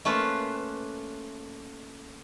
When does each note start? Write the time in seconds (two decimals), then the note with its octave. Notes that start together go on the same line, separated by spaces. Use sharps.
0.05 A3 A#3 C#4 F4 B4